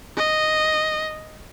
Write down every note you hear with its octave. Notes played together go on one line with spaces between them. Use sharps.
D#5